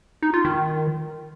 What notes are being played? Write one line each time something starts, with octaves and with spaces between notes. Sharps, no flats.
D#4
F4
D#3